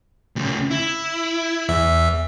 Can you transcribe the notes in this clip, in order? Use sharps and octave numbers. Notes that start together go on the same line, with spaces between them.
D2 C#3
E4
E2 E5